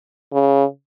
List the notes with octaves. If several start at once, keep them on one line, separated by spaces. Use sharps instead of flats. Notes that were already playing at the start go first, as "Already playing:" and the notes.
C#3